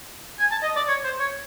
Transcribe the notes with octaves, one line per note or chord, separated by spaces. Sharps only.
G#5
A5
D#5
D5
C#5
C5
C#5